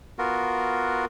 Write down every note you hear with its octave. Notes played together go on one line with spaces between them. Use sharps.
B3 F4 F#4 A#4